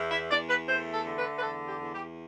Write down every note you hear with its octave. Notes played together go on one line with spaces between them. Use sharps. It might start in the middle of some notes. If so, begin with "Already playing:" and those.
Already playing: E2
E5
E2 D5
B4
A3 C5
A4
D3
B4
B4
E2 A4
G4
E2
G4